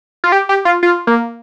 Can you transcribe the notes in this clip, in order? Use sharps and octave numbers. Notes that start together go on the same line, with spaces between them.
F4
G4
G4
F4
F4
A#3